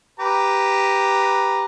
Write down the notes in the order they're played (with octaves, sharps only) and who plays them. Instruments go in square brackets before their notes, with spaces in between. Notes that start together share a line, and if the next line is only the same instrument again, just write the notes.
[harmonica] G4 B4 A#5